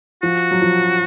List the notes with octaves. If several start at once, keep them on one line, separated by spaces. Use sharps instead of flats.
F3 F#4
F#3
F3